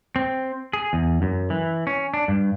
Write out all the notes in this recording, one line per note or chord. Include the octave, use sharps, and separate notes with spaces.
C4
G#4
E2
F#2
E3
C#4
D4
G2